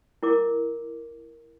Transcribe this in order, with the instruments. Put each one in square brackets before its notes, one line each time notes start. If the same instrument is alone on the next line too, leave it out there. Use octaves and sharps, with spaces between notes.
[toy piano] E4 A#4 D6